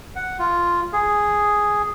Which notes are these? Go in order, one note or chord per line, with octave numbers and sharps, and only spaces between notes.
F#5
F4
G#4